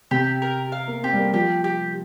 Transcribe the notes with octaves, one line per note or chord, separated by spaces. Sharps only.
C3 G4
A#4
F5
A#3
C4 G4
G3
A#3
F3 G4
G4